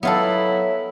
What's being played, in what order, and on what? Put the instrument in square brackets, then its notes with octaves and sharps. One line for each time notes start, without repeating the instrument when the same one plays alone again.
[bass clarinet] F#3 [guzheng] B3 F4 A4 [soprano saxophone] E4